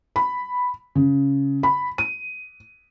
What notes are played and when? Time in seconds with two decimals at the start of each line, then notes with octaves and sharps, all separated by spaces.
0.16 B5
0.95 C#3
1.63 B5
1.98 D#7